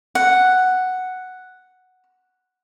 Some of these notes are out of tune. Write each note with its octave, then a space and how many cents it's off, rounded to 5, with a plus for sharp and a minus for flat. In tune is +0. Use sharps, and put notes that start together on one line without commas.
F#5 +0